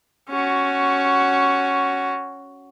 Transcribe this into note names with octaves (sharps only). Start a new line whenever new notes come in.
C#4 F#4